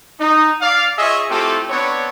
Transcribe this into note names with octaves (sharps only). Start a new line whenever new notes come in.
D#4
D5 F5
F4 G#4 C#5 D#5 E5
A3 C4 E4 F4 G4 A4
B3 C4 D4 C#5